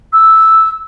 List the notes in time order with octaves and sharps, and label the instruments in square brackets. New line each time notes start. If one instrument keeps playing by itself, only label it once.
[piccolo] E6